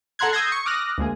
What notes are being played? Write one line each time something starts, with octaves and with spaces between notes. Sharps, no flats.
A4 F#5 A#5 C6 F#6 G#6
D#6 E6 G6 G#6 A#6 C7
C#6
D6 D#6 F6 F#6 A#6
D2 G#3 A#3 G#4